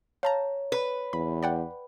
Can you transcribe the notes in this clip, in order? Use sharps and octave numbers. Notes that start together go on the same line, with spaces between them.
C#5 F5 A5 A#5
B4
E2 B5
D5 F#5 G5